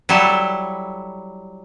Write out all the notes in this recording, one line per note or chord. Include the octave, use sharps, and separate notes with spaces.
F#3 G3 E4 A4